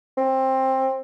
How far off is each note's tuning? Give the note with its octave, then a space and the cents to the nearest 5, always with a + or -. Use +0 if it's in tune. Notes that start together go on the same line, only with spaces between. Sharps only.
C4 +15